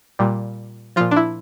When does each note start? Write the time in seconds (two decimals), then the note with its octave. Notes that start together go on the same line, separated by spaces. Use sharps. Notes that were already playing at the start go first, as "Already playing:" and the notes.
0.19 A#2 G3
0.96 A#2 F3 F4
1.11 D4
1.16 E4